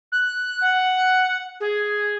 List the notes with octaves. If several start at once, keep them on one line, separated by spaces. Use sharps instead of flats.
F#6
F#5
G#4